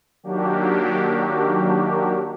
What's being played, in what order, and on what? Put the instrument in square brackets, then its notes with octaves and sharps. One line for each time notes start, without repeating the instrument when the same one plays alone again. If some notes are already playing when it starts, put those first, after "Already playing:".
[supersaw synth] D#3 F#3 A#3 D4 F#4 G4